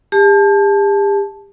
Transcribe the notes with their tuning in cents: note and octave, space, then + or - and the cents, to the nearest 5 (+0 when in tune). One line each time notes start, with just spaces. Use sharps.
G4 +40 A5 -15